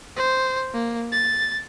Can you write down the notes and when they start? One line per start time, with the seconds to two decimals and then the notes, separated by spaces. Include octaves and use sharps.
0.17 C5
0.74 A#3
1.12 A6